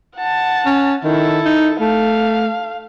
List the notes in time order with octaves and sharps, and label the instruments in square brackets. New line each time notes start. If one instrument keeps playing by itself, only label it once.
[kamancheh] F#5 A5
[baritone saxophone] C#4
[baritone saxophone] D#3 [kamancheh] E4 A4
[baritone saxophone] D#4
[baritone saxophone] A3 [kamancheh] F5